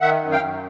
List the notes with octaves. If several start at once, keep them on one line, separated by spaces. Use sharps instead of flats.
D#3 E5 F#5
F#2
F5 G5
F#2